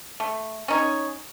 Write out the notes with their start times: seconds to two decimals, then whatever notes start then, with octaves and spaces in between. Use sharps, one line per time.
0.20 A3
0.68 C#4 D#4 C#5